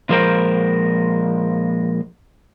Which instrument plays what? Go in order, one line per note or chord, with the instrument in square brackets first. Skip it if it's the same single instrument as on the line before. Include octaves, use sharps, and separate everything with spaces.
[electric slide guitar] A#2 F3 G#3 A#4 C5 G5